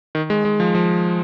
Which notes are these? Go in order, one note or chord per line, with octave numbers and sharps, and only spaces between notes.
D#3
G#3
G#3
F3
F3